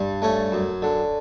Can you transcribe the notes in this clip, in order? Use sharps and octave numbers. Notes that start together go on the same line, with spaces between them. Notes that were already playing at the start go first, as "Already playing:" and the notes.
Already playing: G2
A3 C#4
F#2
D3